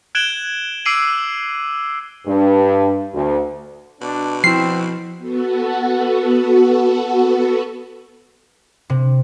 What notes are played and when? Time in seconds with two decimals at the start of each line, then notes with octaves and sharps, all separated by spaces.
0.15 F#6 G#6 D7 E7 F#7 G7
0.85 D6 E6 C7 D7 D#7 F#7
2.26 G2
3.13 D2
4.01 B2 D4
4.44 F3 C4 E4 C7
5.18 B3 F#4 A4
8.90 C3